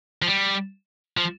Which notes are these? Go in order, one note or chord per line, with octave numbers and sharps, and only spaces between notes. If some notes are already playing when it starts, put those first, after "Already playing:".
F3
G3
F3